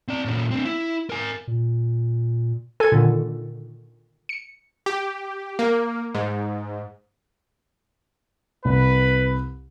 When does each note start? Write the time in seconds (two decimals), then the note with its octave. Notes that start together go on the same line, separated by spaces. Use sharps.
0.08 C4 D5
0.25 A#2 C#4
0.51 C4 D4
0.65 E4
1.10 A#4 G#5
1.47 A#2
2.80 A4 G#5 G#6
2.92 A#2 D3 D#3
4.29 C#7
4.86 G4
5.59 A#3
6.15 G#2
8.65 C2 B4